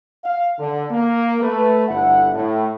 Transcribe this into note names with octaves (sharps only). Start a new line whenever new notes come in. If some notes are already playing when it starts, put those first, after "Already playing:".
F5
D3
A#3
A3 B4
G1 E4 A4 F#5
A2